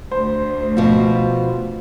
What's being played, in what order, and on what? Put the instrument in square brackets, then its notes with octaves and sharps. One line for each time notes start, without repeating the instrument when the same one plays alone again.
[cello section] D2 [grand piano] C5
[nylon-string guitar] B2 F3